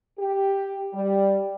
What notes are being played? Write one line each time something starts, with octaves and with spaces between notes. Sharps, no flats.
G4
G3